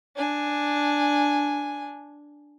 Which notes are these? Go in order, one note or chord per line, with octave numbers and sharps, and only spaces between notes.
D4 G#5